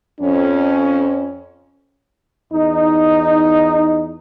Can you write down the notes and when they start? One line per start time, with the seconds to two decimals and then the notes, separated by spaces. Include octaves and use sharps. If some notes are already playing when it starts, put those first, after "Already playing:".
0.21 F2 C#4
2.51 E2 D#4